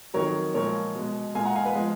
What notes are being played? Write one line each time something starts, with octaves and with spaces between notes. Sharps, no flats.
F2 D#3 F#3 A#4 C#5
A#2 F3 G#3 A#4 C#5
B2 G#3
A#2 G#3 F5 G#5
F#5 A#5
F5 G#5
B4
F3 G#3